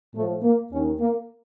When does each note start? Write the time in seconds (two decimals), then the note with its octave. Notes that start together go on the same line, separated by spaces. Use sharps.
0.14 A2 F3 A3
0.43 A#3
0.71 D#2 D#3 C#4
0.99 A#3